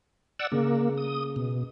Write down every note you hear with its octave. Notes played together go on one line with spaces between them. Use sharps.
D5 F#5 E6
C#3 A#3
D#6
B2